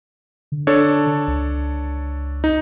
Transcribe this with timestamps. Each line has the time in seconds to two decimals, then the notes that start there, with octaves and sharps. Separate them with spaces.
0.52 D3
0.67 D4 A4 C#5
1.28 C#2
2.44 D#4